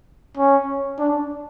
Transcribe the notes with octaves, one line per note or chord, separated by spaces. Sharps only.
C#4
D4